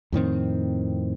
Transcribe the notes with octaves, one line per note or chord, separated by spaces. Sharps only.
F2 A2 D#3 C4